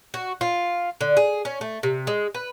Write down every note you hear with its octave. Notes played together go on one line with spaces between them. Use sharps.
F#4
F4
D3
G#4
C#4
A3
C3
G#3
B4